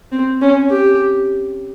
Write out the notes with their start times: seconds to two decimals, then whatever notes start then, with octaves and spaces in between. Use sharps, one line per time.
0.12 C4
0.41 C#4
0.70 G4